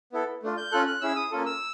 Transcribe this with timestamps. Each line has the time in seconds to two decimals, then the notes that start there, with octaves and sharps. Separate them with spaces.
0.12 B3 E4 A4
0.43 A3 D4 F4
0.57 G6
0.72 C#4 F4 A4 F#6
0.87 F#6
1.01 C#4 E4 G#4 E6
1.16 D#6
1.31 A#3 C#4 F4 A4
1.46 E6